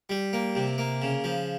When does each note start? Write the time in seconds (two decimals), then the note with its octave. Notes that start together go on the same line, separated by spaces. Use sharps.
0.09 G3
0.33 A#3
0.55 C3
0.78 A#3
1.02 C#3
1.24 F3